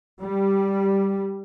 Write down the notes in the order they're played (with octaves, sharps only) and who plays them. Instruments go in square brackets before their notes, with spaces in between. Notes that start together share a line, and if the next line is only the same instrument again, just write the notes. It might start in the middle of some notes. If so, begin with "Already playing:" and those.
[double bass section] G3